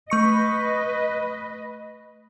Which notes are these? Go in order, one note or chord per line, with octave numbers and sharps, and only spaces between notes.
A3 B4 D#5 C#6 C#7